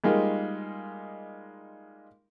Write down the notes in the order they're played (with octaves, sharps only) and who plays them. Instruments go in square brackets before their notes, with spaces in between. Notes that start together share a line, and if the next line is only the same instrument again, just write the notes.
[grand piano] G3 G#3 A#3 D#4 F4